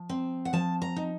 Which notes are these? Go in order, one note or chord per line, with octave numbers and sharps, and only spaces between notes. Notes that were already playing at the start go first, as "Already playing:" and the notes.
Already playing: F3
C4
F#5
F3 A5
A#5
D#4